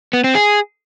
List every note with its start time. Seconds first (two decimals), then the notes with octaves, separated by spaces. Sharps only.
0.13 B3
0.24 C4
0.35 G#4